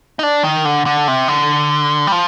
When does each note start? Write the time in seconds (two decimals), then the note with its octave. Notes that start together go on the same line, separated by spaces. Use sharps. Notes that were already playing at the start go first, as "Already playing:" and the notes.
0.19 D#4
0.23 D4
0.44 D#3
0.65 D3
0.86 D3
1.08 C3
1.28 D3
2.07 G3
2.12 F3